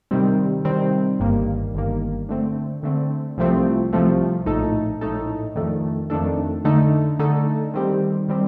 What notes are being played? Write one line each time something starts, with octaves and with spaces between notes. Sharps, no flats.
C3 D#3 G3 C4
C3 D#3 G3 C4
G1 G2 D#3 A#3
G1 G2 D#3 A#3
D3 A3 C4
D3 A3 C4
C2 C3 F3 A3 C4
C2 C3 F3 A3 C4
A#1 A2 A3 D#4 A4
A#1 A2 A3 D#4 A4
F2 D#3 A3 D4 A4
F2 D#3 A3 D4 A4
D3 A3 D#4 A4
D3 A3 D#4 A4
D#3 G3 C4 G4
D#3 G3 C4 G4